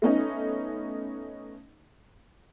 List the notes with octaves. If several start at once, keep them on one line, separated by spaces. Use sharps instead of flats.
A3 B3 C#4 D#4